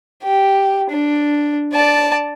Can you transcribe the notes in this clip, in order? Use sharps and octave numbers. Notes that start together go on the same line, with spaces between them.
G4
D4
D5 A5